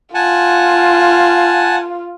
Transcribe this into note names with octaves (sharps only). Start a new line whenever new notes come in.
F4 F#5 G#5 A5